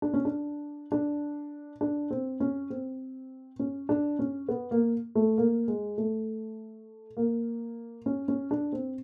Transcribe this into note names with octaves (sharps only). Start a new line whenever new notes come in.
D4
C#4
D4
D4
D4
C4
C#4
C4
C#4
D4
C#4
B3
A#3
A3
A#3
G#3
A3
A#3
C#4
C#4
D4
C4